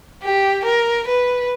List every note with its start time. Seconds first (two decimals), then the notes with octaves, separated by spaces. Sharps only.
0.23 G4
0.65 A#4
1.08 B4